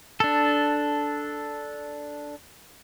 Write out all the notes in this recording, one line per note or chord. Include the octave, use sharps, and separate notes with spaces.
D4 A4